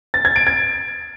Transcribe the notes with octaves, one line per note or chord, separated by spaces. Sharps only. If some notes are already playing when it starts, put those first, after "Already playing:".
A6
G#6
D7
G#6